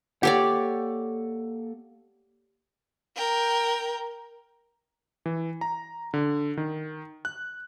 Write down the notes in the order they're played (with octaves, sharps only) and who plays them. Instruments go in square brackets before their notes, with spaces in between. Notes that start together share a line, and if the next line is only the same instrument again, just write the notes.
[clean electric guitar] A#3 A4 F#5 [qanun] G4 C#5 D5
[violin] A#4 G5
[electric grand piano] E3
A#5
D3
D#3
F#6